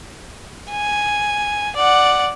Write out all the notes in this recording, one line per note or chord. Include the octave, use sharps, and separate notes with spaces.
G#5
D5 F#5